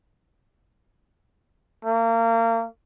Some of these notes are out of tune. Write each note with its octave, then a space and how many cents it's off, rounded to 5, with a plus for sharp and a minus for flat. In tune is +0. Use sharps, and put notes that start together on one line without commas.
A#3 -30